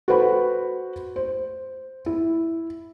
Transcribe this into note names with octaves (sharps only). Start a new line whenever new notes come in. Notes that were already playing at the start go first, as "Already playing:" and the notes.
F#4 A4 B4 C5 F#5 B5
C5
E4